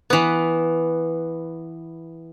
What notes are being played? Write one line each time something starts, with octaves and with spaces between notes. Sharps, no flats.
E3 B3